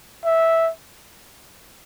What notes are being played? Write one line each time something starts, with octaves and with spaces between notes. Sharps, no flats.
E5